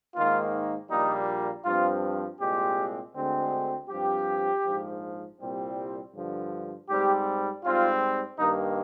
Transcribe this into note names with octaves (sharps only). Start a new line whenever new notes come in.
G#2 D#3 A#3 F4
A#1 A#2 G3 A#3 D#4
G2 F3 C4 F4
C2 A#2 G#3 C4 G4
D2 D3 G#3 C4
G2 F3 C4 G4
A#1 G#2 F3
C2 A#2 G3 C4
G2 D3 F3
G#2 G3 C4 G4
G#2 G3 C4 F4
G2 D#3 A#3 D#4